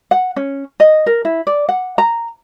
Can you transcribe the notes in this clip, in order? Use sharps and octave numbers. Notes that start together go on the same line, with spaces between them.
F#5
C#4
D#5
A#4
E4
D5
F#5
A#5